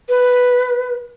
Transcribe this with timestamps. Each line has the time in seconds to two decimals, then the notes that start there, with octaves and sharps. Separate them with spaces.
0.09 B4